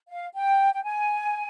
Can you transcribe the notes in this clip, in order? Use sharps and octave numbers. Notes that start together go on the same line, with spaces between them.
F5
G5
G5
G#5